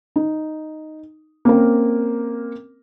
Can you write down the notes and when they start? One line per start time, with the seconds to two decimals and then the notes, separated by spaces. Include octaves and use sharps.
0.16 D#4
1.45 A#3 C4 C#4 A#4